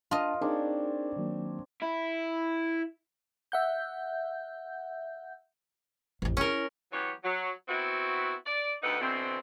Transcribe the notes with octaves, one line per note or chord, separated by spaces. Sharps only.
D4 F4 A#4 D#5 A5
C4 D4 D#4 G#4 A#4 C#5
D#3 F#3 A#3
E4
E5 F#5 G6
A1 F2
C#4 E4 A#4
E3 F#3 B3 G4 C#5
F#3
B3 C4 E4 F#4
D5
D2 D#4 G4 A4 B4 F#5
B2 D3 E3 C4